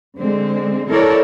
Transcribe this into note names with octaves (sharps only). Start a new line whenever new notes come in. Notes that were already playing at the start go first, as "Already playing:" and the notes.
D3 G#3 C4
E4 A4 A#4 C#5 D5